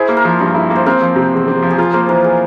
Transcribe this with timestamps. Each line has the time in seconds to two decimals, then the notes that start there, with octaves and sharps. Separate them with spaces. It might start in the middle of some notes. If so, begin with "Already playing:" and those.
Already playing: E4 G#4 C5
0.08 A#3
0.17 A#4
0.25 F3
0.40 G2
0.54 E4
0.70 A#3
0.76 C5
0.86 C4 A#4
1.01 F3
1.16 C3
1.32 E2
1.48 C4
1.62 F3
1.70 G#4
1.78 F4 A#4
1.93 A#3 C5
2.09 E3 A#4
2.24 G#4